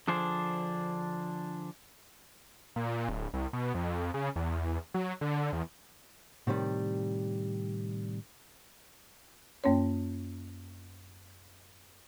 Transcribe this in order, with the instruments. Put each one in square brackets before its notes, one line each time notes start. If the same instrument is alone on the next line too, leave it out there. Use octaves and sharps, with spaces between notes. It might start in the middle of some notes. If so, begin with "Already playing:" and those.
[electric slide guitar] D3 F3 D4 G#4 C5
[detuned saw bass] A#2
D1
C2
B2
F2
C#3
E2
F#3
D3
E2
[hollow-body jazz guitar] A2 C3 D#3 G3
[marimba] F#2 A#3 C#4 C#5